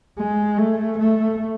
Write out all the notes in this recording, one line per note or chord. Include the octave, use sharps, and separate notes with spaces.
G#3
A3
A3